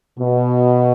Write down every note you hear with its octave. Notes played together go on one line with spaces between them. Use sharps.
B2